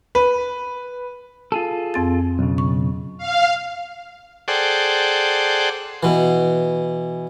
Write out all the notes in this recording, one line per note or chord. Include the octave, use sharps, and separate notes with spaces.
B4
F4 G#4 A4
F2 C4 A6
B1 C#3
C#6
F5
G#4 A4 C5 D5 F#5 G5
B2 E3